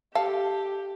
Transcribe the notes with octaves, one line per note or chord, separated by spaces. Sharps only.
G4 A4 F5